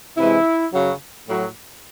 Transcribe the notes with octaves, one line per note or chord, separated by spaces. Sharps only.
C3 E3 G#3 E4
F#2 C#3 F#3
A2 F#3